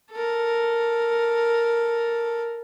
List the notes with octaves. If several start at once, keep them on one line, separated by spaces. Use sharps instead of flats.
A4 A#4